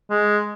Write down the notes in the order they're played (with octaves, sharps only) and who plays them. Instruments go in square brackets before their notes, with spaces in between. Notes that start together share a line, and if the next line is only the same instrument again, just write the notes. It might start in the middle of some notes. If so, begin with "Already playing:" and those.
[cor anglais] G#3